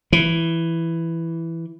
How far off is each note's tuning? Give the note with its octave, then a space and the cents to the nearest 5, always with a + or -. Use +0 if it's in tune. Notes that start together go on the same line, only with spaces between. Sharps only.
E3 +5